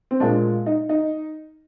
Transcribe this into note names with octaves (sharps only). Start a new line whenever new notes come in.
C4
A#2 G#3 D4
D#4
D#4